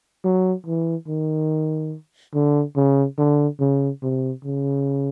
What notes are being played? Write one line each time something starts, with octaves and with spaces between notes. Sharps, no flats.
F#3
E3
D#3
D3
C#3
D3
C#3
C3
C#3